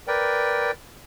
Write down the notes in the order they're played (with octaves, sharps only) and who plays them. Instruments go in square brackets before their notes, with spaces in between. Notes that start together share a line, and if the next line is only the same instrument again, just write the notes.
[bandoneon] A#4 B4 D5 G5